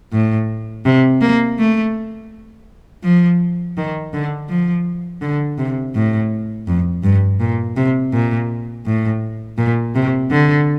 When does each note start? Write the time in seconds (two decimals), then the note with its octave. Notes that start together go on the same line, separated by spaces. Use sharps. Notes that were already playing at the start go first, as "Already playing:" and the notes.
0.13 A2
0.85 C3
1.21 A#3
1.58 A3
3.04 F3
3.77 D#3
4.13 D3
4.49 F3
5.22 D3
5.58 C3
5.95 A2
6.67 F2
7.03 G2
7.40 A#2
7.77 C3
8.13 A#2
8.86 A2
9.58 A#2
9.95 C3
10.31 D3